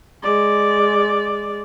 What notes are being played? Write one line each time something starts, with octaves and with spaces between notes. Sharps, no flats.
G#3 D5